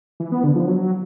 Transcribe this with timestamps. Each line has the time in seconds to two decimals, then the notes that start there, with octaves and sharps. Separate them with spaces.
0.20 E3
0.32 B3
0.44 D3
0.55 F3
0.67 F#3